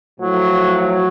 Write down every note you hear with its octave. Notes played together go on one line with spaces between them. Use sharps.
A2 F3 F#3
F#3